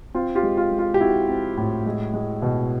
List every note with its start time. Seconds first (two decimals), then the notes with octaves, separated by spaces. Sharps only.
0.14 C4 F4
0.35 F4 G4
0.43 G#3
0.57 F4
0.71 G#3
0.79 F4
0.94 G4
1.00 C4 E4 F#4
1.29 C4
1.57 A2
1.86 G#3
2.14 G#3
2.42 B2